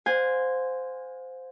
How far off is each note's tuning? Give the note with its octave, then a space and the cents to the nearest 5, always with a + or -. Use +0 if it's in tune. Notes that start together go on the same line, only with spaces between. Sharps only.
C5 -10 F5 +40 G#5 -15